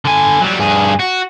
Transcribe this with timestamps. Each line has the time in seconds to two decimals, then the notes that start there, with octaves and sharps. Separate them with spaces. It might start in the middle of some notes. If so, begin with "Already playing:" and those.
0.05 D3 G#5
0.41 F#3 G3
0.59 G2 G#4
1.00 F#4